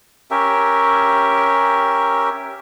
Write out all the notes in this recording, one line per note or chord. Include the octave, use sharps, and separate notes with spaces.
C#4 G4 A#4 E5